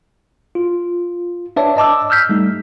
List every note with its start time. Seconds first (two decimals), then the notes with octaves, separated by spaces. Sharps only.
0.55 F4
1.56 D4 B4 C#5 D5 E5 A5
1.77 D#5 A5 D6 E6
2.10 E6 F6 G6 B6
2.29 G3 A3 D#4